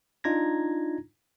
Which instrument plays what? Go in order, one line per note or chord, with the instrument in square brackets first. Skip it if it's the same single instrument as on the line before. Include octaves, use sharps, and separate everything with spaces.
[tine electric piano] D4 D#4 F4 A#5 G#6 A#6